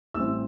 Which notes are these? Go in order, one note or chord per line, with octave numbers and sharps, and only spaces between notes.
A1 A2 E3 G3 C4 E6